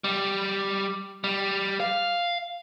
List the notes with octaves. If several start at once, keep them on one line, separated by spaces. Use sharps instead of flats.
G3
G3
F5